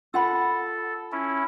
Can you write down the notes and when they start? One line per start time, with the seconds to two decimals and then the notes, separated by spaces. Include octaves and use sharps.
0.14 F4 A4 F#5 B5
1.12 C#4 E4